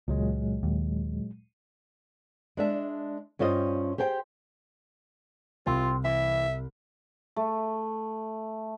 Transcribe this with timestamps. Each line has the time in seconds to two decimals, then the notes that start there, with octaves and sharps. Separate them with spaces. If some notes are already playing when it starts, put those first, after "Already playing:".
0.08 C#2 A#2 F#3 G#3
0.63 D#2
2.57 G#3 D4 E5
3.39 G2 C#4 F4 C5 D#5
3.98 G4 G#4 C5 G5
5.66 C2 C4 F4
6.05 E3 E5
7.36 A3